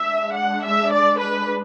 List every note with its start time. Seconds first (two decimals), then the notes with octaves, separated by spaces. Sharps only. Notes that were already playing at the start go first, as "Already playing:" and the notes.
Already playing: G#3 D4 E5
0.34 F#5
0.63 E5
0.91 D5
1.19 B4